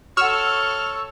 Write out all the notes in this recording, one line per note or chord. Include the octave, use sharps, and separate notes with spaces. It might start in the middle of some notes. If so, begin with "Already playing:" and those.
F#4 A4 C#5 F#5 C#6 E6 F6